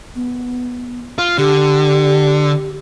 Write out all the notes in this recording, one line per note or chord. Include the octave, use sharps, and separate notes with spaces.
B3
F4
D3 G4